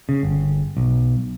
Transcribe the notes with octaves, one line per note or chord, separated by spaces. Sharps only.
C#3
G1
B1